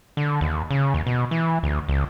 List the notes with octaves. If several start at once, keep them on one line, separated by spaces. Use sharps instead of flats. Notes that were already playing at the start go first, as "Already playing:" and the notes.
D3
D#2
C#3
D#2
B2
E3
D2
C#2